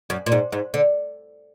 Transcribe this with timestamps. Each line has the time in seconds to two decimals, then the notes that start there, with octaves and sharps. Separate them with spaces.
0.10 F#2
0.26 A#2
0.32 G#2
0.52 G#2
0.74 D3